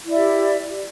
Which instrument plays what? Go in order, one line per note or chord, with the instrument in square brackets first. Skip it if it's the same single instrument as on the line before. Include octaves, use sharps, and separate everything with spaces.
[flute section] E4
D5
E5
G4